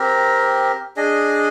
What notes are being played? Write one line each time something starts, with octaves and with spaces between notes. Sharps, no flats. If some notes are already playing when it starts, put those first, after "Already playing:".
Already playing: C4 G4 A#4
D4 G#4 D#5